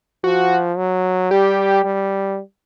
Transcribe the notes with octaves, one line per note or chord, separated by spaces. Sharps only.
F3 F#4
F#3
G3 G4
G3